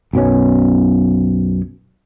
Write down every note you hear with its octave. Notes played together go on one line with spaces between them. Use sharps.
B1 F#2 B2 C#4